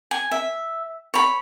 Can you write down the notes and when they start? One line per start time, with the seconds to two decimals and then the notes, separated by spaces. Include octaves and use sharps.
0.11 G#5
0.31 E5
1.14 C#5 B5